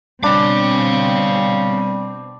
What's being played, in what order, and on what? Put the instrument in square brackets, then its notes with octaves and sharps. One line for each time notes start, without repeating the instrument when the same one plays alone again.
[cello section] B2 C4 [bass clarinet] G3 [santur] D4 [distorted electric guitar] C#5 F5